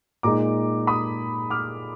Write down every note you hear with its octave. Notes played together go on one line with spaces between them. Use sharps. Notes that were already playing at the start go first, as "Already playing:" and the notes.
A#2 G#3 D#4 A#5 D6
B5 D#6
D6 F6